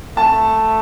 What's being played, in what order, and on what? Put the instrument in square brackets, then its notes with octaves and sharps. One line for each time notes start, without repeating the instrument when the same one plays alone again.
[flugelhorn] A3 [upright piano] A5